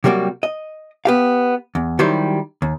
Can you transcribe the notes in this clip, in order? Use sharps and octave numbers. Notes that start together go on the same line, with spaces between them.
C3 F#3 G3 A#3 F#4
D#5
B3 G4 F5
E2
D#3 F#3 G3 E4 G4 C5
D#2